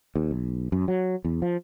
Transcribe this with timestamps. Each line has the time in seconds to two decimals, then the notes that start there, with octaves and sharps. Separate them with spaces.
0.16 D#2
0.31 B1
0.72 F#2
0.88 F#3
1.25 E2
1.42 F3